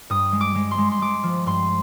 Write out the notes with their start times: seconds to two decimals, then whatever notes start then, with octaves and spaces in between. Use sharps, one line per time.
0.10 G2 D#6
0.32 G#3
0.41 D6
0.55 G#3
0.71 C6
0.78 G#3
0.92 C6
1.02 G#3 D6
1.23 F3
1.46 G2 C6